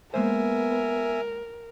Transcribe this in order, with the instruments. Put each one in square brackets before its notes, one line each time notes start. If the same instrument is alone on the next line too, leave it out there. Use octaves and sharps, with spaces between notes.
[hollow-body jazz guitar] G#3 A#3 C5 [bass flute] B3 [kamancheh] A#4 [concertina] E5 G#5